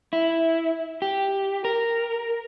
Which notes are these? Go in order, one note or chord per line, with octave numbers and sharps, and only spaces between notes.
E4
G4
A#4